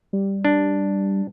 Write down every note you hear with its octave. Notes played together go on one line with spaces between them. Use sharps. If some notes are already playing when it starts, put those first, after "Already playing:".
G3
D4